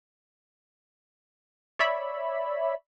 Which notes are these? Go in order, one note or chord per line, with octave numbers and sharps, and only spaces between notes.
C#5 D5 E5 B5